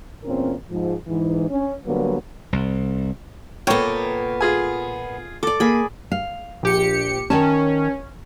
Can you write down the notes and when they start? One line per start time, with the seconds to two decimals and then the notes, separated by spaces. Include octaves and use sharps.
0.24 E2 A#2 C4 C#4 F4 A#4
0.70 G#2 F3
1.07 G#2 E3
1.49 C#4
1.85 D3 F#3 G3 A#3 B3 B4
2.53 C2
3.67 A#2 A#3 B3 A4 C#5 G5 A#5
4.41 F4 G#4 G#5
5.43 A4 D5 D6
5.60 A#3 G#4 B5
6.11 F5
6.63 A#1 G4 C#7
7.30 D#3 C#4 C#5 A5